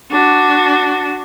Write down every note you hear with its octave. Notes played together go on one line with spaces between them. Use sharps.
D4 F#4